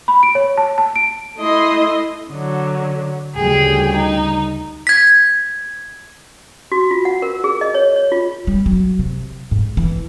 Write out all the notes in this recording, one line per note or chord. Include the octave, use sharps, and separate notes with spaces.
B5
D7
C#5
A5
A5
D7
A3 E4 D#5 C6
D3 F#3
D2 C#3 G3 G#4 G5
D#4
G#6 B6
F#4
F4
F#5
A#4
G#4
D#5
C#5
C#5
F4
G3
F#3
C3
G#2
E3